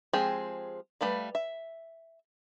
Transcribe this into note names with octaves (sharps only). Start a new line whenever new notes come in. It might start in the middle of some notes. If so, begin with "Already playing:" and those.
F3 G#3 C4 G4 G#4
G3 A3 B4 F5
E5